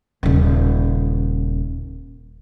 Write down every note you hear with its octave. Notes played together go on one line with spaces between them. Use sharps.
D#1 C#3